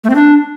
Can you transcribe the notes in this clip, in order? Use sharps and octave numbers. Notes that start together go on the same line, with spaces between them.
A3
C4
D4